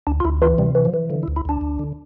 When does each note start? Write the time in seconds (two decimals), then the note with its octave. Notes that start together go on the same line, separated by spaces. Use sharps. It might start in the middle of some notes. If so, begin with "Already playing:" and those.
0.07 D2 D4
0.20 F4
0.25 D2 E4
0.42 E3 F4
0.58 C3 G3
0.75 E3
0.85 F3
0.94 E3
1.10 D3 F3
1.23 E4
1.28 D2
1.36 E4
1.45 D2 D4
1.61 D2
1.79 D3